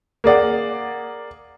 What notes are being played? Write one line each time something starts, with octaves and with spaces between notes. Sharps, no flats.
A#3 G#4 D5 F#5